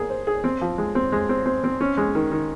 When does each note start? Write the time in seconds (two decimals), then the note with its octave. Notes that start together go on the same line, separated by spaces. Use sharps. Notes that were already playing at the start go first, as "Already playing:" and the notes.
Already playing: A#3 G#4
0.10 C5
0.27 G#4
0.44 C4
0.61 F3
0.78 G#3
0.95 C4
1.12 G#3
1.29 C4
1.46 C4
1.64 C4
1.81 C#4
1.97 G#3
2.15 D#3
2.31 D#3